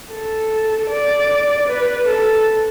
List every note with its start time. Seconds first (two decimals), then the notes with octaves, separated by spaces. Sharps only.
0.12 A4
0.90 D5
1.69 B4
2.08 A4